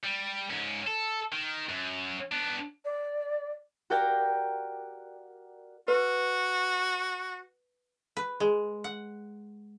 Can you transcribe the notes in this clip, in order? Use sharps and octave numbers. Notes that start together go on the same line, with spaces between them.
G3
G#2 C#4
A4
D#3
F#2
B3 D4
D5
F#4 G4 A#4 D5 F5 G5
F#4 B4
B4
G#3
F#5